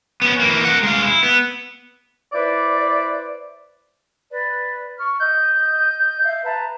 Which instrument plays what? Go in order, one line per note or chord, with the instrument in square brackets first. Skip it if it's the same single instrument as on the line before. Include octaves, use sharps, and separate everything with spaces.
[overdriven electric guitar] B3 C#4
E3 A#3
A#4 F#5
G#3 F5
E4
B3
[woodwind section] E4 B4 C5 D5
[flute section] B4 D5
C#6 F6
[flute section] D#5 [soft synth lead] G6
[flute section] E5 F5
B4 A5 A#5